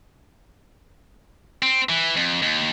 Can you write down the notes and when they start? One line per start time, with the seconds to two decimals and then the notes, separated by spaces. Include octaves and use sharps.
1.62 C4
1.89 E3
2.17 F2
2.43 D#2